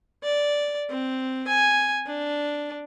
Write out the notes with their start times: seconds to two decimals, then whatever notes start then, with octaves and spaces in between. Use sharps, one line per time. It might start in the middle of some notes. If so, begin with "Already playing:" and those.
0.24 D5
0.90 C4
1.48 G#5
2.07 D4